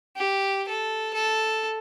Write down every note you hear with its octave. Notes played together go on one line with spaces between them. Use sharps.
G4
A4
A4